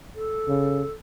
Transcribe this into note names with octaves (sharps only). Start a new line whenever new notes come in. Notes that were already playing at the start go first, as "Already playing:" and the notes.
A4
C#3